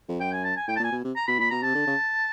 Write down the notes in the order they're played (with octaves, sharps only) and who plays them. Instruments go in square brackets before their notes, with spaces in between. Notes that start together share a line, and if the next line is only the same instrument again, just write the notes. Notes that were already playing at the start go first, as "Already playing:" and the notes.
[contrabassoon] F2
[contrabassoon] F#2 [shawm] G5
[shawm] G#5
A5
G#5
[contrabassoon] A2 [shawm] G5
[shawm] A5
[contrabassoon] A#2
[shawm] G#5
[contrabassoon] B2
C3
[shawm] A#5
[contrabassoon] B2 [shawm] B5
[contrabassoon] A#2 [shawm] B5
[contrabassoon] B2 [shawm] A#5
[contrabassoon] C3 [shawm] A5
[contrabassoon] D3
C#3